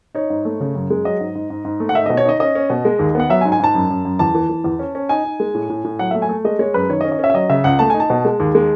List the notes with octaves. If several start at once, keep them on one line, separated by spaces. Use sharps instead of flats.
D#4 C#5
G#2
A3
C#3
F#2
G#3
F#3 D#5
G#2
G#2
G#2
G#2
A3
F#5
D#4 E5
B2 D#5
C#5
D#4 D#5
C#4 D#5
C#4
B2
G#3
D#2
B3 F#5
F#3 E5
G#5
G#2
G#5
G#2 A5
F#2
F#2
F#2
E2 A5
E3
E3
E2
C#4
C#4
D#4 G#5
D#4
G#3
A2
A2
A2
F#3 F#5
A3 E5
G#5
A3
G#3 D#5
G#3 C#5
F#2 B4
D#3 C#5
D#5
C#4
D#5
C#4 E5
E5
F#3 D#5
C#3 E5
C#2 F#5
A3 A5
D#4 G#5
A5
B2
G#3
D#2
G#3